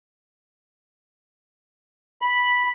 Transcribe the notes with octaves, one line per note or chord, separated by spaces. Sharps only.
B5